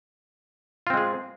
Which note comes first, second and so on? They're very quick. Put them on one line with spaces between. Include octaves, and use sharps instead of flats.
F4 C4 G#3 G#4